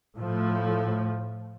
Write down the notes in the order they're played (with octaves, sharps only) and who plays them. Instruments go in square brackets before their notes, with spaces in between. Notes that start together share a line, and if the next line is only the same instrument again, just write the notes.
[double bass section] A2 F3 A3